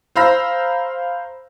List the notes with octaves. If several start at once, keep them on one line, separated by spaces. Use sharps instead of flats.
C5 F5 A#5 B5 E6 A#6